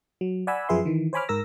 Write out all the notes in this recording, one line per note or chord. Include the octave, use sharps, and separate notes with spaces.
F#3
D5 F#5 G#5 B5 E6
F#2 F3 G#4 B4 E5 C6
D#3 E3
C5 C#5 G#5 B5 D6 F6
G#2 A#4 E6 A#6